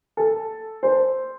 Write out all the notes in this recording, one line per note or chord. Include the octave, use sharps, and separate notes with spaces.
A4
C5